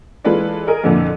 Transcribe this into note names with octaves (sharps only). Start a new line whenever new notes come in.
E3 G#3 F4 A4 B4 D5
G#4 A#4 D#5
F2 A#2 D3 F3 E4